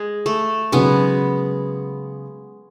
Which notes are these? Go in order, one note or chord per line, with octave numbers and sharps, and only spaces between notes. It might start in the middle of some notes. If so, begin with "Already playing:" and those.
Already playing: G#3
A3
C#3 F#3 G#3 B3 C#4 F#4